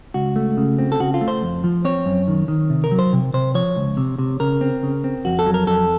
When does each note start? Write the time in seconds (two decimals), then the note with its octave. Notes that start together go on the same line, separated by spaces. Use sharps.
0.14 C#2 F#4
0.36 A3
0.57 C#3
0.79 C4
0.92 A4
1.00 C#3 F#4
1.14 F4
1.21 A3
1.28 C5
1.43 F2
1.64 F3
1.85 C4 C#5
2.06 F#2
2.28 D#3
2.48 D#3
2.70 C3
2.84 A#4
2.92 F#3
2.99 C5
3.13 C3
3.33 C3 C5
3.54 F3 C#5
3.76 C#2
3.97 C3
4.19 C3
4.40 C#3 A#4
4.61 C4
4.83 C#3
5.04 C4
5.25 F2 F#4
5.39 A4
5.46 F#3
5.54 A#4
5.67 F2 A4